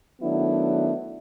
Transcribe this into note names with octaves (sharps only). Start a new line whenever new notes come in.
D#3 F#3 A3 B3 D4 E4